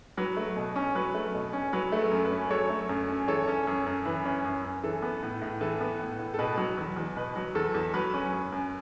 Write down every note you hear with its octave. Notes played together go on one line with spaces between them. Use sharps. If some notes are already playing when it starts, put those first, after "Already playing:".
F#3 B4
A3
B2
C#4
F#3 B4
A3
B2
C#4
F#3 B4
A3
A4
F#2
B4
C#4
F#3 A4 C#5
A3
F#2
C#4
E3 A4 C#5
C#4
F#2
F#2
E3 B4
C#4
F#2
F#2
E3 A4
B3
A2
A2
E3 A4
B3
A2
A2
A4
B2 B4
F#3
E2
E2
B2 B4
F#3
E2 A4
E2
F#3 B4
C#4
F#2
F#2